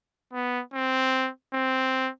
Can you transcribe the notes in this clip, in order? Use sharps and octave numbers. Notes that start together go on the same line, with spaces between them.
B3
C4
C4